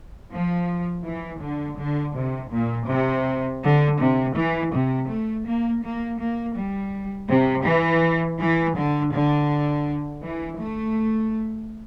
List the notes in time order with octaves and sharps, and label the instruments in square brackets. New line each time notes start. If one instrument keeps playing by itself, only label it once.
[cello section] F3
E3
D3
D3
C3
A#2
C3
D3
C3
E3
C3
A3
A#3
A#3
A#3
G3
C3
E3
E3
D3
D3
E3
A3